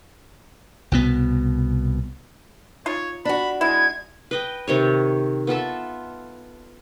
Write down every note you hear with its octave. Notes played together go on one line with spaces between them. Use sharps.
C2 B2 B3
D#4 F4 C#5
D4 F#4 B5
G#3 E4 G#6
B4 D#5 G5
C3 D#3 C#5
B3 F4 A4 E5